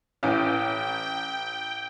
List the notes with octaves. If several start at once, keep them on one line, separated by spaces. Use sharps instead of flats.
A1 E3 C#4 G5